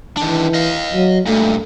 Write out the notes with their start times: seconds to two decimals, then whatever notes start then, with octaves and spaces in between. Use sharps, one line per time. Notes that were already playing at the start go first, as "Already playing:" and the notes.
0.17 D#3 E3 D4
0.54 D#5 F5
0.93 F#3
1.27 G2 A#2 A3